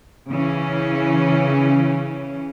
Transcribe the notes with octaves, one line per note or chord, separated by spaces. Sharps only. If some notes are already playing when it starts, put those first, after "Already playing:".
C#3 E3 C#4